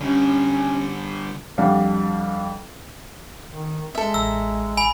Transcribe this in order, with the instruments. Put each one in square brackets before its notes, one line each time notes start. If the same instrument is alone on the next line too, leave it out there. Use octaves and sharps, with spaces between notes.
[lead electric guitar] D3 G3 [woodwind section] C#4
[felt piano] F2 G3 D4 F5 F#5
[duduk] D#3
[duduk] G#3 [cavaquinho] A4 E5
[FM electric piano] A1 A#5 [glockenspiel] E6
[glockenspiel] G#5 B5